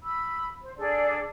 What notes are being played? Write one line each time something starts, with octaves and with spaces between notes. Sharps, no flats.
B5 E6
C5
D4 G#4 A4 D5